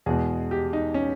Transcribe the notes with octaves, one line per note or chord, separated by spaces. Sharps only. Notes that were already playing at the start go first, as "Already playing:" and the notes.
E2 B2 G#3 G#4
G4
D#4
C#4